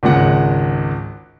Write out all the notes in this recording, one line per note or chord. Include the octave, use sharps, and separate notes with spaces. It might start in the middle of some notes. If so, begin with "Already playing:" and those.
G#1 C#2 G#3 F#5